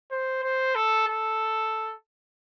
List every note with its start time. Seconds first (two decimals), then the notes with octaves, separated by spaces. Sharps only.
0.11 C5
0.43 C5
0.75 A4
1.08 A4